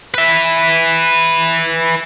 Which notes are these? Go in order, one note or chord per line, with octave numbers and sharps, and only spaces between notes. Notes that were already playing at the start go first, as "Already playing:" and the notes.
B4 E5